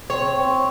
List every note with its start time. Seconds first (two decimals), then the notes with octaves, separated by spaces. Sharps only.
0.10 C4 C#5
0.37 C4